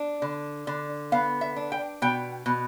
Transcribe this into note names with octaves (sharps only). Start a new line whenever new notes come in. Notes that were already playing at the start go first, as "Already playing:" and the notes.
Already playing: D4
D3
D3
B3 F5
E5
D4
G5
B2 G5
B2